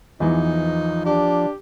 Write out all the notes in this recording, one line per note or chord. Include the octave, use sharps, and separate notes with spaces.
E2 E3 F3 D#4
D4 G4